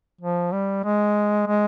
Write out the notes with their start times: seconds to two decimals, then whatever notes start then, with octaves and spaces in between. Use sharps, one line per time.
0.21 F3
0.52 G3
0.84 G#3
1.47 G#3